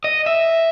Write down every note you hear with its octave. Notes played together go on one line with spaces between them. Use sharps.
D#5
E5